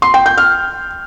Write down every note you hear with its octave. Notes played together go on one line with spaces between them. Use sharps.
C6
G5
G6
F6